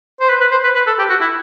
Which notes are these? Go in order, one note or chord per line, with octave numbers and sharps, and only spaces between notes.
C5
B4
B4
C5
B4
B4
A4
G4
F#4
E4